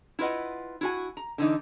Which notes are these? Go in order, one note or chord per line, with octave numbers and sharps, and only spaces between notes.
E4 F4 B4 D#5 F#5
E4 F#4 G#5
A#5
D3 E3 D#4